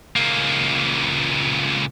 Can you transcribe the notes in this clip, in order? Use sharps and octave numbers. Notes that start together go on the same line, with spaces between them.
C#2 A#3